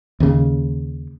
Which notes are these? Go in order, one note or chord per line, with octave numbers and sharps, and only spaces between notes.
D#2 C#3